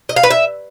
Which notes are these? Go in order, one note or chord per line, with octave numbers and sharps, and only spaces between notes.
D#5
F5
B4
E5